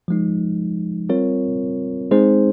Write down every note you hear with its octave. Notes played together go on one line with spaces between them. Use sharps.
F3 G#3 D#4
G3 C4 F4 A#4 C#5
G#3 C4 D#4 G#4 C5